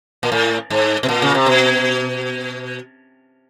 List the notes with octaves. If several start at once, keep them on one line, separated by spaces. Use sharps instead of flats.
A#2
A2
G#2
B2
A#2
C#3
C3
B2